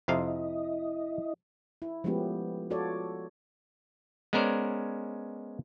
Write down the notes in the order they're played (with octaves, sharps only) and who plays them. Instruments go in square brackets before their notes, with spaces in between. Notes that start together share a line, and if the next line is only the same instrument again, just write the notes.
[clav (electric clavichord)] F2 C3 F5 [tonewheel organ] E4 D#5
[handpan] E4
F3 G#3 A3 B3 C#4 G4
F4 F#4 A4 C#5 D5
[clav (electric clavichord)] G#3 B3 C#4 A#4 C5 D5